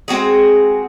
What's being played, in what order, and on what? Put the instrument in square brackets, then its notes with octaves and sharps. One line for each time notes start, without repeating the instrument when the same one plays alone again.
[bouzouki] G#3 C4 F#4 G#4